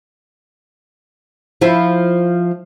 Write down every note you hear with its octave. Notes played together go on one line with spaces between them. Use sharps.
F3 E4